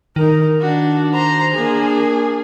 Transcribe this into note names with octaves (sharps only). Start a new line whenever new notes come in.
D#3 D#4 A#4
D4 F#4
C5 A#5
A#3 D4 G#4